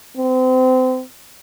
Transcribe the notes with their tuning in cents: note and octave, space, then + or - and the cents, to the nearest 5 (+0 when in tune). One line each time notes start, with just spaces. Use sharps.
C4 -30